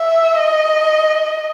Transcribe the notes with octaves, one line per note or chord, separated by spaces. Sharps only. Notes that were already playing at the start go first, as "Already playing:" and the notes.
Already playing: E5
D#5